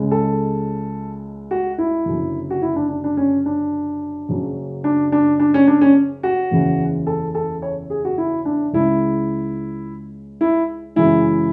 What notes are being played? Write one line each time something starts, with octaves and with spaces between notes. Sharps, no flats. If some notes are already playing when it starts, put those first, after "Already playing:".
Already playing: C#2 C#3 G#3
A4
F#4
E4
F#1 F#2 D3
F#4
E4
D4
D4
D4
C#4
D4
F#1 F#2 C#3 F#3
D4
D4
D4
C#4
D4
C#4
F#4
F#1 E2 C#3 E3
A4
A4
C#5
G#4
F#4
E4
D4
C#2 C#3 G#3 E4
E4
F#2 C#3 E3 G#3 E4